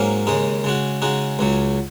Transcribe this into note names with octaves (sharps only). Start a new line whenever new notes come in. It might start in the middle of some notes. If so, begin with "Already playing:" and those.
Already playing: G#2 F#3 A#3 C#4
D#2 C#3 G#3 D#4
C#3 G#3 F#4
C#3 G#3 D#4 F#4
C#2 C#3 F#3